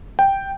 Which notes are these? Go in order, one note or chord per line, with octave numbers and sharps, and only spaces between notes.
G5